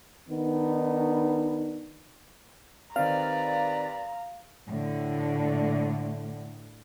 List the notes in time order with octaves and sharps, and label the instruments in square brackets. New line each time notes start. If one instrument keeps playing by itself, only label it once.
[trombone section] D#3 B3 D4 D#4
[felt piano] D#3 C4 [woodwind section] G4 B4 D5 [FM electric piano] F5 [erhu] A#5
[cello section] A2 D3